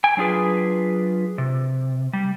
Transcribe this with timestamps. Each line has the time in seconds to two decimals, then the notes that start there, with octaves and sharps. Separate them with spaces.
0.04 G5 G#5
0.17 F#3 D4 F4 G#4 B4
1.38 C3
2.13 G3